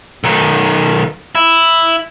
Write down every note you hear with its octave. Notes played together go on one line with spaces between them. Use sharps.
B1 D#3
E4